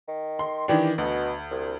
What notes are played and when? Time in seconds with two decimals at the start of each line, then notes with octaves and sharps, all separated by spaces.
0.08 D#3
0.39 C6
0.68 D#3 E3 D4 G4
0.98 D2 B2
1.51 C2